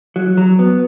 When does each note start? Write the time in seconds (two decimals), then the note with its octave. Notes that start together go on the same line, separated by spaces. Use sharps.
0.16 F#3
0.37 F#3
0.59 B3